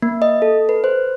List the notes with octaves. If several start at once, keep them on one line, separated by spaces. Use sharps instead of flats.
A#3
D#5
A4
B4
C5